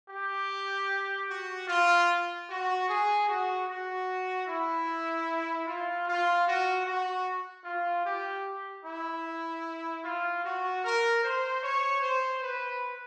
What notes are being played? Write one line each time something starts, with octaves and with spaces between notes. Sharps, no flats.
G4
F#4
F4
F#4
G#4
F#4
F#4
E4
F4
F4
F#4
F#4
F4
G4
E4
F4
F#4
A#4
C5
C#5
C5
B4